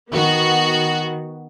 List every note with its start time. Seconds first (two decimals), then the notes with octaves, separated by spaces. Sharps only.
0.12 D#3 B3 F#4